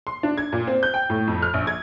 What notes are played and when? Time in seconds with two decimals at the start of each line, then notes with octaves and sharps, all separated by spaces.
0.07 C6
0.23 D4
0.38 G#6
0.53 A#2
0.67 C4
0.83 G6
0.94 G5
1.10 A2
1.27 F2
1.42 F6
1.54 A#1
1.67 G#6